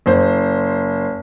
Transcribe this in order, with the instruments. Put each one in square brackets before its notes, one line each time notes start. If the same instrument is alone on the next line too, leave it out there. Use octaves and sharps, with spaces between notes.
[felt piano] F#1 C5